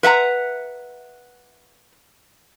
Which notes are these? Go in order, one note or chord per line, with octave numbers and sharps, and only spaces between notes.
B4 E5 F#5 A#5